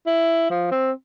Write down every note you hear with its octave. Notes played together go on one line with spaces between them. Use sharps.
E4
F3
C4